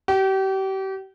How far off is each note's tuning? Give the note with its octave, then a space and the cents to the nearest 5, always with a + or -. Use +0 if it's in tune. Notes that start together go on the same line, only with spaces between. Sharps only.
G4 -35